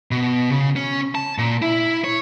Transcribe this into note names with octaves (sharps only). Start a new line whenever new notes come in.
B2
C#3
C#4
A5
A#2
E4
C#5